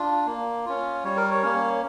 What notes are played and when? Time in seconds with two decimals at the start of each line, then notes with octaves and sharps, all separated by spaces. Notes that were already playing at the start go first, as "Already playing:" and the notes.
Already playing: D4 F4
0.26 A#3
0.65 C#4 F4
1.04 G3 C#5
1.17 A#4
1.31 C#5
1.43 A#3 C#4